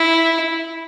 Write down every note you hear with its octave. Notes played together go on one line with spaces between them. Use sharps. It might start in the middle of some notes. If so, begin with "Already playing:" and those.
Already playing: E4